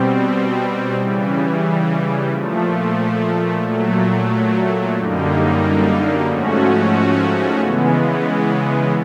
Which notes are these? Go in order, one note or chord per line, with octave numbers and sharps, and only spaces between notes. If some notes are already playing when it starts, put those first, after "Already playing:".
Already playing: B2 G3 C4
C#3 E3 G3
A#2 F3 A3
A#2 F#3 A3
F#2 D3 G3 A#3 D#4
G#2 F3 A3 C#4 F#4
C#3 E3 G#3 B3